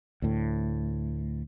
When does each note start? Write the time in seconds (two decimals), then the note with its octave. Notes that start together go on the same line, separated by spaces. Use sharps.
0.22 D2 A2